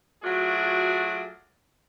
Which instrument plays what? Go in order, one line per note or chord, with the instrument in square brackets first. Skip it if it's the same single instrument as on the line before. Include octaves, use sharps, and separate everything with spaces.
[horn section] F#3 A3 F4 F#4 G#4 D5